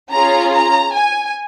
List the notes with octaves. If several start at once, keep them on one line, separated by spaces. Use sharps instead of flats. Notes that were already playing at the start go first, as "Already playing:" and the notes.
C#4 F4 G#4 A#5
A#5
G#5